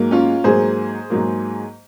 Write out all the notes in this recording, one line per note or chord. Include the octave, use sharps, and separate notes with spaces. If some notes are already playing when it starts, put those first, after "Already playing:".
Already playing: G#2 F#3 A#3
C#4 F4
G#2 F#3 A#3 G#4 C5
G#2 F#3 A#3